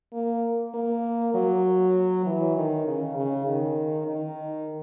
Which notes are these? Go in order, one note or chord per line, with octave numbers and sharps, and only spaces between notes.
A#3
A#3
F#3
E3
D#3
C#3
C#3
D#3
D#3